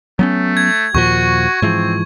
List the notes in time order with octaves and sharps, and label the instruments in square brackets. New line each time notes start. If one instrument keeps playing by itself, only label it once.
[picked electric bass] F#3 B3 C#4 [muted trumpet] A3
[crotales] G#6
[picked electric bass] D#2 A#2 F3 [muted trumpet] F#4 [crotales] C#6
[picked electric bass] G#2 E3 F3 [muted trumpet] C4